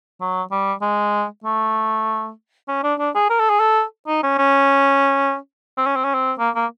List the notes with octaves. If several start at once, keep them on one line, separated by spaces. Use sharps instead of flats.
F#3
G3
G#3
A3
C#4
D4
D4
G#4
A#4
A4
G#4
A4
D#4
C#4
C#4
C4
C#4
C4
C#4
C4
A#3
A#3